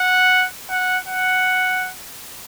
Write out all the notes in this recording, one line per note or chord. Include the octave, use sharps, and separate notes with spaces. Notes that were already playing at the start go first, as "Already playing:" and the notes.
Already playing: F#5
F#5
F#5